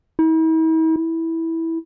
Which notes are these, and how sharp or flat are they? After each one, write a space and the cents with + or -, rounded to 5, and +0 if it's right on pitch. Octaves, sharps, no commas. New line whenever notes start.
E4 -45
E4 -10